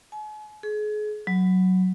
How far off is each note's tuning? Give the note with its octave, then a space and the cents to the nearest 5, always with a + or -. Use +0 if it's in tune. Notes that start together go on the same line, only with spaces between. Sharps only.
G#5 +45
G#4 +35
F#3 +5